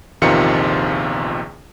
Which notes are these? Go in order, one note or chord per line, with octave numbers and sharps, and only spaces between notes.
A#1 E2 C3 D#3 F4 C#7